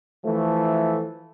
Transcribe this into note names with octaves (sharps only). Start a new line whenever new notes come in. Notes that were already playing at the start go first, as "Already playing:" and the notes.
E3 F3 A3